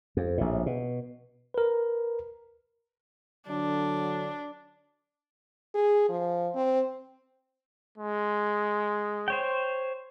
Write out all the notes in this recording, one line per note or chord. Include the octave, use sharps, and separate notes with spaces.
F2
A#1 A2
B2
A#4 B4
D3 F#3 D4
G#4
F3
C4
G#3
C5 C#5 G5